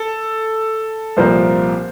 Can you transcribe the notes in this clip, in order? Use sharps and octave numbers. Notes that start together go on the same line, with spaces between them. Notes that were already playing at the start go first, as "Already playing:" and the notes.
Already playing: A4
C2 A#2 F3 A#3 C5